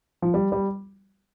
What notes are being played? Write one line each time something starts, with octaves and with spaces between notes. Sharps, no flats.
F3
G3
G3